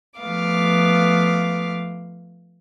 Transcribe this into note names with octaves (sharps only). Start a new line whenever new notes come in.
F3 A3 B3 F5 D6